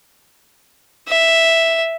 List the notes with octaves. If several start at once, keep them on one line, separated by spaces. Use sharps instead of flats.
E5